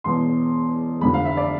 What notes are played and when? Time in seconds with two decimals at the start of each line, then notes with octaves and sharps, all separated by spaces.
0.04 E1 E2 B2 C6
1.01 F1 F2 D3 B5
1.14 F5
1.25 E5
1.37 D5